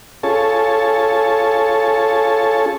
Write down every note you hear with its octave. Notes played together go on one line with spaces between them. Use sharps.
C#4 F4 G#4 A4 C#5 A5